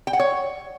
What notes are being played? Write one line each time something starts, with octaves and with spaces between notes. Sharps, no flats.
G5
F#5
C#5